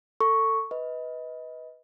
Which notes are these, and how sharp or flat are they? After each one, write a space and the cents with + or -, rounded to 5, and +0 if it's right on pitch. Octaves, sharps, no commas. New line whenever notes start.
A4 +30 C#6 +0
B4 +0 D#5 +25